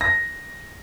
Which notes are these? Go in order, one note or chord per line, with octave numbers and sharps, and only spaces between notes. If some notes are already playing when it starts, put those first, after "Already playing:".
A#6